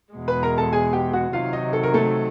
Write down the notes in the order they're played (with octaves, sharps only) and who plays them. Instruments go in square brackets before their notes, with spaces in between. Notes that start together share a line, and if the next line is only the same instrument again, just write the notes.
[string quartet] E2 B2 G#3
[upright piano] B4 B5
A#4 A#5
A4 A5
G#4 G#5
G4 G5
F#4 F#5
[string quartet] C3 D#3 F#3 [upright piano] F4 F5
[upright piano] D#4 D#5
A4
A#4
A3 A4